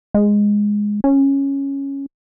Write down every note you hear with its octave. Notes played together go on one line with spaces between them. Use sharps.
G#3
C#4